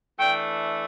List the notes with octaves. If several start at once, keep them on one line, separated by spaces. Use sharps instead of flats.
E3 A3 D4 G5